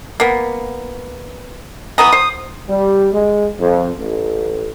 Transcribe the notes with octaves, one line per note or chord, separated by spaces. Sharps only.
A#3 B3
E3 B3 A#5 D#6
C5
G3
G#3
F2
A1